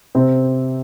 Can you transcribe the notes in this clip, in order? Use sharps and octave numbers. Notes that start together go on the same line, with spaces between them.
C3 C4